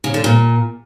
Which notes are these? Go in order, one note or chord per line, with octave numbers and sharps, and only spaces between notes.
C#3
D3
A#2